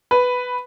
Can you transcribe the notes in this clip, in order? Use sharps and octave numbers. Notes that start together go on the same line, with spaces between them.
B4